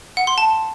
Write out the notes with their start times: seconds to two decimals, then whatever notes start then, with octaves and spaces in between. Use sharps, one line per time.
0.17 F#5
0.27 C6
0.38 A5